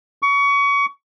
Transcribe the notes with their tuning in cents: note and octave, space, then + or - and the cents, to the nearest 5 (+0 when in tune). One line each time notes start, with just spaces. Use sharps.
C#6 +25